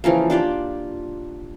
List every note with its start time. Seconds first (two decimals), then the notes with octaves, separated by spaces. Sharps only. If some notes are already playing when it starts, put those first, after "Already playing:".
0.04 C#3 E3 F3 A#3
0.30 D4 F4 G4 D5